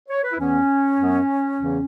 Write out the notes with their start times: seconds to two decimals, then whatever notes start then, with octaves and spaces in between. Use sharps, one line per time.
0.09 C#5
0.24 B4
0.32 E4
0.39 E2 E3 B3 C#4
0.98 F#2 F#3 B3
1.58 E2 C#3 E3